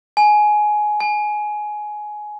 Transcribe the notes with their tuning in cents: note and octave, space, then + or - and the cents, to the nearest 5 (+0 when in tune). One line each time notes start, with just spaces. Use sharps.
G#5 +15
G#5 +15